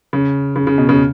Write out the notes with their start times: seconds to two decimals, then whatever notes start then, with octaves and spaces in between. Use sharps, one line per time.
0.13 C#3
0.56 C#3
0.67 C#3
0.78 B2
0.89 C#3